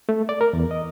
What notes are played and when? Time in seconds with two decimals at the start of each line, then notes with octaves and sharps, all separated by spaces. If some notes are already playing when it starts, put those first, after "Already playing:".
0.09 A3
0.29 D5
0.41 A#4
0.53 E2
0.71 D#5